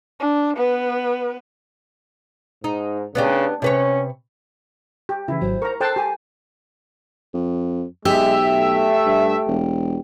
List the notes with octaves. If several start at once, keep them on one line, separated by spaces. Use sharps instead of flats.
D4
B3 B4
G#2 D#4
C#3 B3 D4 G4
C3 C#4 B4 C#5
G4
C#3 E3 E4
G#1 F#3 C5
A#4 A#5 C#6
A4 C5 G5 A5 F#6 C7
G4 G#5
F2
B1 G#3 G4 E5
A3
G2
E1